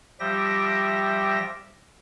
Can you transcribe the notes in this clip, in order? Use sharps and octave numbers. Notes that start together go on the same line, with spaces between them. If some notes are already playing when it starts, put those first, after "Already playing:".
F3 G3 G4 E5 G5 A#6